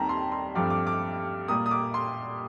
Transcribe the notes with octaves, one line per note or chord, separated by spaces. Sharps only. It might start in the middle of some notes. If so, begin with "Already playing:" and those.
Already playing: D#2 D#3 G3 C4 A5 A#5
C6
C6
G2 F3 A3 C4 D6
D6
D6
A#2 G3 A#3 D#6
D#6
D6
C6